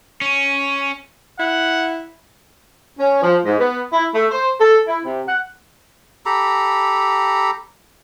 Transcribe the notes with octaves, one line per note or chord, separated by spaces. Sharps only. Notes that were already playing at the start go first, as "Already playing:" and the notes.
C#4
E4 F#5
C#4
F3
G#2
B3
E4
A3
C5
A4
E4
C3
F#5
G4 A4 A#5 B5